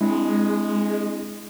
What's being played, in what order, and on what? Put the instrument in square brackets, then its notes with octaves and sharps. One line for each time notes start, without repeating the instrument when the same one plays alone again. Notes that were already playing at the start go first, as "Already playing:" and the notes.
[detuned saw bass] G#3 [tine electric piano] C4 D4 E4